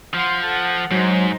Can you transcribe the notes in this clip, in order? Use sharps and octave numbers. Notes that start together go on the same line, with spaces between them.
F3 F#5 C6
A4 F#5
G#2 F#3 D#4 C5